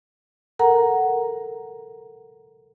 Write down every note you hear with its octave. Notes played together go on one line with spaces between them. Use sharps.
A4 A#4 F#5 A#5